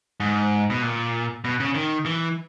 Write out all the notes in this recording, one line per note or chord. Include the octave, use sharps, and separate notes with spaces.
G#2
B2
A#2
B2
C#3
D#3
E3